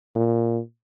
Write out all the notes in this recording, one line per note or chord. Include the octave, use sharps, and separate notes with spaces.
A#2